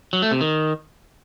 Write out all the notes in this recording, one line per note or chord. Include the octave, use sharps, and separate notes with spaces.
F#3
A3
C3
D#3